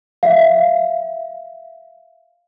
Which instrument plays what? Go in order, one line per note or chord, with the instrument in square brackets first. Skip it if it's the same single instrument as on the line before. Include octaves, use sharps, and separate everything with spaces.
[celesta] E5 F5